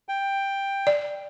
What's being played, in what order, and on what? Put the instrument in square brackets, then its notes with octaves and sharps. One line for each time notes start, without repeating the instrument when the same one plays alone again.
[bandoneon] G5
[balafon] D5